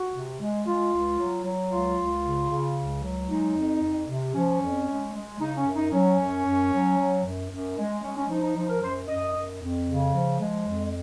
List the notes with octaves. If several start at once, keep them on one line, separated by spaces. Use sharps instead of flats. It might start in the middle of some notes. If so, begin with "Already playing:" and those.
Already playing: F#4
C3
G#3
G#3 F4
C#2
F#3
F#3
C#2 F4
C#2
C#3
C#3
C#2
F#3
G#3 D#4
F2
F2
C3
F3 C#4
F2
G#3
G#3
C#3 D#4
C#4
F#2
D#4
F#3 C#4
F#2
F#2
F#3
F#3
F#2
F#2
G#3
G#3 C#4
C#4
F3 D#4
D#4
F3 D#4
A#4
F#2 C5
F#2 D#5
F#2
F2
C#3
F3
G#3
F2